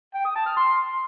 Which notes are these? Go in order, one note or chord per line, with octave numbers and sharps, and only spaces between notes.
G5
D#6
A5
F6
C6